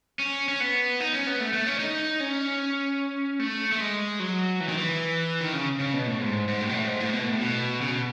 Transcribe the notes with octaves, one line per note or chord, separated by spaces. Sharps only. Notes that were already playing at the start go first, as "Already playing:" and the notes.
C#4
C#4
B3
D#4
C#4
B3
A3
A3
C#4
D#4
C#4
A3
A3
G#3
F#3
E3
D#3
E3
D#3
C#3
C#3
B2
A2
G#2
G#2
A2
B2
A2
G#2
A2
B2
A2
B2
C#3
B2